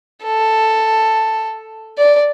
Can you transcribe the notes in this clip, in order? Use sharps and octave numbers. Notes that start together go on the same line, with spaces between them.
A4
D5